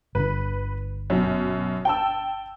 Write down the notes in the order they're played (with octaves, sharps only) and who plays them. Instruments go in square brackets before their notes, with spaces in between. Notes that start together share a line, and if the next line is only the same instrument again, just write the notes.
[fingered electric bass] G1 D3 [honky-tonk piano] B4
[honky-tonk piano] F#2 B2
G5 A5 E6